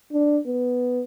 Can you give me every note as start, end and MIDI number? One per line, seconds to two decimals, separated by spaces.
0.13 0.38 62
0.47 1.03 59